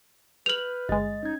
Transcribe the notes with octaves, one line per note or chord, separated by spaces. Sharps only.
B4 F6 G6 F7 F#7
G1 G#3 D#5 A6
C#4 D#4 G#6